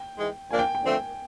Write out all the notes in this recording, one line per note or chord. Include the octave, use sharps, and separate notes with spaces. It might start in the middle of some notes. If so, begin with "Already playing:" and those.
Already playing: G5
G#2 E3 G#3
A#2 F3 A#3 D4 G#5
G5
G5
D3 F3 A3 C4